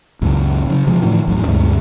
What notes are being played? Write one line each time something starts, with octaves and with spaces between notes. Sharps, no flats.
C#2 F#2 A#2
C#3 F#3
C3 F3 G#3
A2 D3 E3 F3
A1 E2 F#3
D2 G2 C3 G#3